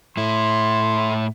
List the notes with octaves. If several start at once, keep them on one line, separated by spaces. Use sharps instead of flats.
A2 E4 C6